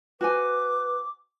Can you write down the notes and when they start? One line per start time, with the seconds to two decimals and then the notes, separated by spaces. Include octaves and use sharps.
0.21 F#4 B4 C5 G#5 D6